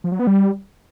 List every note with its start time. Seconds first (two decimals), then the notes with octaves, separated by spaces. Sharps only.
0.04 F3
0.12 F#3
0.19 B3
0.27 G3